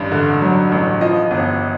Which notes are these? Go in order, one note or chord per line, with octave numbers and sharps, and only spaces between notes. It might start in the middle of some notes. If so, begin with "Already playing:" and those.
Already playing: A1 G2
D3
F#3
A1
F3 D#5
G1